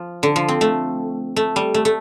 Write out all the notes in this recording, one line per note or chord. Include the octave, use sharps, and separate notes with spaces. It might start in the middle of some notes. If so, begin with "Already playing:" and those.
Already playing: F3
D3
F3
C4
A3
A3
G3
A3
A3